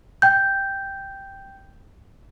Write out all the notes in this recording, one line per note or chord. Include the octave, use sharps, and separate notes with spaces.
G5 G6